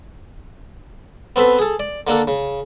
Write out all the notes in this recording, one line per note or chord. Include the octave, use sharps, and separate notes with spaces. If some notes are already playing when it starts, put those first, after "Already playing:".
B3 C4 A4 B4
G#4 A4
D5
D3 A#3 D4 A4
C#3